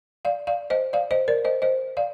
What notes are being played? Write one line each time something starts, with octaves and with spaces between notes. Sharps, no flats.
D5 F5
D5 F5
C5 D#5
D5 F5
C5 D#5
A#4 D5
C5 D#5
C5 D#5
D5 F5